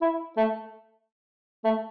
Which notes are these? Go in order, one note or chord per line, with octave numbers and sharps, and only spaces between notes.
E4
A3
A3